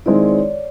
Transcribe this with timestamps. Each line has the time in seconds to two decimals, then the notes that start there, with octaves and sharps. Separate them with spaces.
0.06 D#3 G#3 C4 E4 D5
0.29 C#5